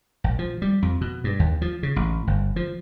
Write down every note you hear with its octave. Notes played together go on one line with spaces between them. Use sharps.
A#1
F3
G3
F2
B2
G2
D#2
F3
C#3
A1
G1
F3